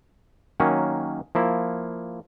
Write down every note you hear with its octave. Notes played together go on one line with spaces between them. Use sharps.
D#3 F#3 A#3 C#4
F3 A#3 E4